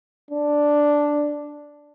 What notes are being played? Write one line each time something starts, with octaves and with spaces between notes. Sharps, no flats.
D4